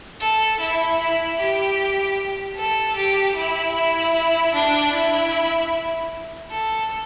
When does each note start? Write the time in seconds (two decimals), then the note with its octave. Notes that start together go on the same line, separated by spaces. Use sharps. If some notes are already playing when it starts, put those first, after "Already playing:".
0.20 A4
0.60 E4
0.99 E4
1.39 G4
2.56 A4
2.96 G4
3.35 E4
3.75 E4
4.54 D4
4.93 E4
6.50 A4